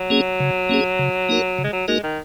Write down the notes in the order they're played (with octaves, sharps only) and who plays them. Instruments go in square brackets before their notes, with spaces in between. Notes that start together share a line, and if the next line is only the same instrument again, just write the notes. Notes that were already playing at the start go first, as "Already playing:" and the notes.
Already playing: [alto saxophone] F#3
[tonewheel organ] A#3 C#4 G#4
C#3
A#3 C#4 G#4
C#3
A#3 D#4 F#4 A#4
C#3
[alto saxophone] G#3
F#3
[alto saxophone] G#3 [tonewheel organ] A#3 D#4 F#4 A#4
[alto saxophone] D#3